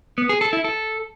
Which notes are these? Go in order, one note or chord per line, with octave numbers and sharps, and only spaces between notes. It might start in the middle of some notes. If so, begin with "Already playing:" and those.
B3
G#4
A4
E4
A4